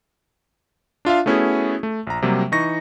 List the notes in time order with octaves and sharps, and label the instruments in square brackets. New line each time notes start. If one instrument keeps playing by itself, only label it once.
[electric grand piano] D4 F4 E5 F5
A3 B3 C#4 E4 F#4 G#4
A3
A#1 A#5
C3 F#3 G3 A#3
E3 D#4 C#6 A#6